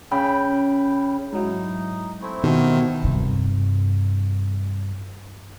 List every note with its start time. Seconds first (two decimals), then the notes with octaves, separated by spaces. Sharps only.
0.11 C#3 G5 B5
1.33 G#2 F#3 D#4 E4
2.21 A3 C4 E4
2.44 B2 D#3 G4 A#4
3.04 G2 C3